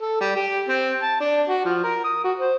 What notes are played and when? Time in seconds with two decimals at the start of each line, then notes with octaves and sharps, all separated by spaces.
0.01 A4
0.21 G3
0.36 G4
0.69 C4
1.02 A5
1.20 D4
1.48 F#4
1.65 F3
1.84 A#4
2.04 D#6
2.24 F#4
2.38 C5